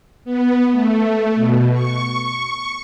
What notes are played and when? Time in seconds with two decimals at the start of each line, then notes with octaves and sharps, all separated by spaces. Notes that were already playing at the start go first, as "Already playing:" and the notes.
0.24 B3
0.71 A3
1.35 B2
1.73 C#6